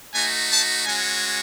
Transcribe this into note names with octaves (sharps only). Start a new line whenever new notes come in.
A3 D#4 F#4 G#5
A5
G#3 C#4 F#4 G#5